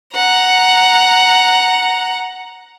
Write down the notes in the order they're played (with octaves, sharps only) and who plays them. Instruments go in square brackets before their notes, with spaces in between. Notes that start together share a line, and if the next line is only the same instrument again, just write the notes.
[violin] F#5 A#5